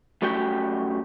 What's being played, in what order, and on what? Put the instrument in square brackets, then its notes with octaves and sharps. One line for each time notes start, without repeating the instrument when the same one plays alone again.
[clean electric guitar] F#2 A3 F#4 G4 G5